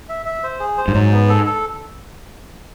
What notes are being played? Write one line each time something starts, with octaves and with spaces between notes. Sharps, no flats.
E5
E5
C5
G#4
C5
G2
G#2 F#3
B3
A4
A4